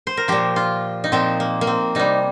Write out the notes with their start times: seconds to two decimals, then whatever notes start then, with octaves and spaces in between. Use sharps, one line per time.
0.07 C5
0.17 A#4
0.28 A#2 F3 G4
0.56 F4
1.04 D#4
1.12 A#2 F3 C4
1.40 A#3
1.61 A#3
1.67 C4
1.95 C3 G3 D#4